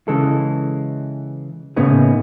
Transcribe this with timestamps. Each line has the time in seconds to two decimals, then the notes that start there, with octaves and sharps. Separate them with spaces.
0.08 C#3 E3 G#3 A4
1.76 A2 C#3 A#3 B3 D#4 G#4